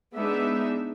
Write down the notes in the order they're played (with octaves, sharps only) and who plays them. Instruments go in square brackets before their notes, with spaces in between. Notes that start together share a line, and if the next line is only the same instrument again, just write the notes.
[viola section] G#3 B3 D4 D#4 E5